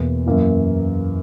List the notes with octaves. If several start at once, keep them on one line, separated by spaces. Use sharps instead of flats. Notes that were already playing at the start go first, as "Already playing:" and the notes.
Already playing: E2 B2 A#3
F#2 E3 A#3 E4